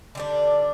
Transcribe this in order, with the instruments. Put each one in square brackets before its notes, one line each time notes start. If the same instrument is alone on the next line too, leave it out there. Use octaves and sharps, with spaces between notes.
[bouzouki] D3 G3 D4